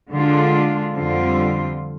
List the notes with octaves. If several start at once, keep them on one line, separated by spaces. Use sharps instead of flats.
D3 G#3 D4 F4
F2 D3 G3 C4 F4